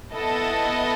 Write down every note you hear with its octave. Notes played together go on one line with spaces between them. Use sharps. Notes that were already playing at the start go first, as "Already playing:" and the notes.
B3 E4 A4 D#5 A5